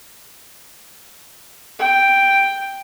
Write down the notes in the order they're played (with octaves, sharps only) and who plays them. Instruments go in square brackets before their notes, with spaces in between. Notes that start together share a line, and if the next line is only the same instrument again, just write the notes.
[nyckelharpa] G5